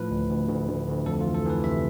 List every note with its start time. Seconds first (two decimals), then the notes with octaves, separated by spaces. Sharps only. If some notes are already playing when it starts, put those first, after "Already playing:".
Already playing: A2 F3 B4
0.11 D2
0.30 D2
0.49 D2
0.69 D2
0.88 D2
1.06 F2 A4
1.21 F4
1.25 E3
1.35 A4
1.45 E3 B4
1.63 C3 E5